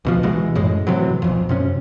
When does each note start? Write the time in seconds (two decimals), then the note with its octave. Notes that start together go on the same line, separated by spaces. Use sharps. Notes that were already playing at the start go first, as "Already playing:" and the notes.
0.05 D2 B2 F3
0.23 B1 B2 E3 G#3
0.55 F#2 A2 G#3
0.87 A2 C3 E3 F#3
1.22 B1 F2
1.49 F#2 C3 C#4